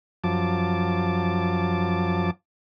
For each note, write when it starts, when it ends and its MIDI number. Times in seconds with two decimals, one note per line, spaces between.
0.24 2.31 42
0.24 2.31 53
0.24 2.31 81
0.24 2.31 86